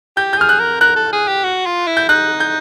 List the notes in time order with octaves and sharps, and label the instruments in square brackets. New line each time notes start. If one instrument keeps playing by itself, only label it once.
[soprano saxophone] G4 [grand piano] G6
[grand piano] G6
[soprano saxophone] G#4 [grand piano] F6
[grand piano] F#6
[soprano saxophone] A#4
[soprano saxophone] A#4 [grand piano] F#6
[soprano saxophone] A4
G#4
G4
F#4
F4
E4
[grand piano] G6
[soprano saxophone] D#4 [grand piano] F#6
[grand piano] G6